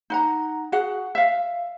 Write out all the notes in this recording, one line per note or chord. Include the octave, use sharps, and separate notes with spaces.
D#4 F#5 A#5
F#4 G#4 F#5
E5 F5